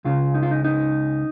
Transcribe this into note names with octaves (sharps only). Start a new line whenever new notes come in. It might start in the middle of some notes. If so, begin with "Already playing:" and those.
C#2 C#3 F4
D#4
F4
D#4
D#4